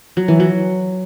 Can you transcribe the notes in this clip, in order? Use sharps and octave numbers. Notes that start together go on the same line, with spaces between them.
F#3
E3
F#3